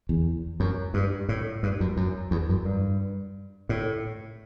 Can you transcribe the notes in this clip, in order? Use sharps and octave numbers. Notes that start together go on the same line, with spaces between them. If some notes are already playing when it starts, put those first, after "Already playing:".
E2
F#2
G2
A2
G2
F#2
F#2
E2
F#2
G2
A2